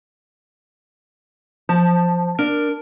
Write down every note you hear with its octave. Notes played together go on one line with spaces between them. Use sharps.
F3 A5
D4 A#4